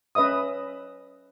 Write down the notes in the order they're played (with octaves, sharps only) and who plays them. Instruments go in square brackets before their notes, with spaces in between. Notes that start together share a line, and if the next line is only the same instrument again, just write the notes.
[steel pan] C#4 B4 D#5 E5 D#6